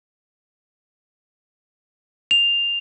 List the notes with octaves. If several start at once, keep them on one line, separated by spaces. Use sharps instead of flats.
F7